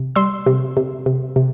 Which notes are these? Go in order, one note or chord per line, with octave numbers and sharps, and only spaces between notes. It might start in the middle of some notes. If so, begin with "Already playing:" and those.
Already playing: C3
G3 C6 E6
C3
C3
C3
C3